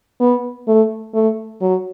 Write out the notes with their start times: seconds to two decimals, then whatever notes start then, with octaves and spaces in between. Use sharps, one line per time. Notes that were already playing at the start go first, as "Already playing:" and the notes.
0.20 B3
0.68 A3
1.14 A3
1.61 F#3